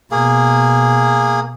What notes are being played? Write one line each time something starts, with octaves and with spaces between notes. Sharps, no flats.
B2 A#3 G#4